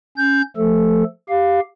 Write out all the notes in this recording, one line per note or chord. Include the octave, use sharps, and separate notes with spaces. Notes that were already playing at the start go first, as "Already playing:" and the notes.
C#4 G6
F3 A3 A4
G4 F5